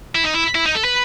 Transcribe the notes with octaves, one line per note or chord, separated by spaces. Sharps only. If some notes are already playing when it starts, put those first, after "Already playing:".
E4
D#4
E4
E4
D#4
A4
B4